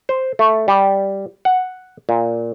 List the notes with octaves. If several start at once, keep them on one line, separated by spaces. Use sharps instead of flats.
C5
A3
G3
F#5
A#2